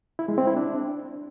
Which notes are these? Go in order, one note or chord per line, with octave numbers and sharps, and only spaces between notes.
E4
G#3
C4
E4
D4